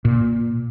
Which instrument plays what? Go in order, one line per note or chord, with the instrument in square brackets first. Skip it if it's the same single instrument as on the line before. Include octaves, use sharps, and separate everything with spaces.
[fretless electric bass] A#2